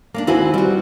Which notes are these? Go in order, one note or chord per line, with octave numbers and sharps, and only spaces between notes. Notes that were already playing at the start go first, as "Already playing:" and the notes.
A#3 C#4 D4
D#2 C4 E4 F#4 B4 G#5
G3 F#4